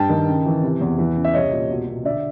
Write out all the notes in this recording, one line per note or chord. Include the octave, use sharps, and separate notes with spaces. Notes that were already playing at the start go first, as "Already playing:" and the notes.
Already playing: G2 G5 A5
D#3
C#3
E3
C3
E2
E3
C#3
E5
C2 C#5 D#5
A#2
B2
B2
D3 D5 E5